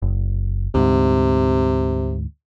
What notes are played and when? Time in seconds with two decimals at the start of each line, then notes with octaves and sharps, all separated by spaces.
0.02 F#1
0.74 D2 G#2 C3